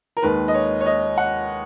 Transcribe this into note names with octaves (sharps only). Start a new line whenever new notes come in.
A#4
D#2 D#3 G#3 B4
D#5
C#5
C#5
D#5
F#5